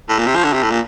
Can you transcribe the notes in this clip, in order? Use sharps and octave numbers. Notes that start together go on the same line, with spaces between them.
A2
A#2
C3
F3
D3
C3
A2
A#2